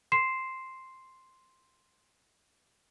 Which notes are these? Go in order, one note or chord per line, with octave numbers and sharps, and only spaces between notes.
C6 C7 E7